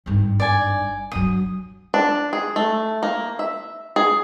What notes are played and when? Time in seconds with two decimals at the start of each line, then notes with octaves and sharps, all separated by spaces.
0.06 G#1 G2
0.40 D5 G#5
1.12 G2 F#3 D#6
1.94 D4
2.33 G#4
2.56 A3
3.03 A#3
3.39 E5
3.96 G#4